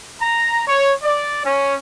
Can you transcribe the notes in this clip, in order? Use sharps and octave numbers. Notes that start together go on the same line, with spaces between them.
A#5
C#5
D5
C#4